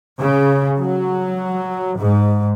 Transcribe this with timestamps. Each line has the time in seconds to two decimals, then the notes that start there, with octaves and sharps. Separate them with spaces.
0.19 C#3
0.79 F#3
2.00 G#2